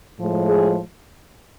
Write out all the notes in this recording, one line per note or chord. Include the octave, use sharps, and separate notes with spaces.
A2 F3 G#3
G#4